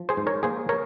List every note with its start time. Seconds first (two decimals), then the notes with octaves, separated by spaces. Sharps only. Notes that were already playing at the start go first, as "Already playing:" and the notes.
Already playing: F3
0.09 G#4 C5
0.17 G#2
0.27 A#4 C#5
0.43 A#3 G#4 C5
0.69 A#4 C#5